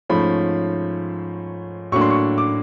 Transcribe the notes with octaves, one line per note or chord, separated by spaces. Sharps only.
G#2 F3 A3 C#4 B5
A2 F#3 A#3 D4 C#6
C6
C#6
D6